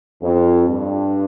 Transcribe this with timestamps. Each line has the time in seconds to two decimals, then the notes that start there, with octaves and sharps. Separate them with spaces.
0.21 F2
0.69 G2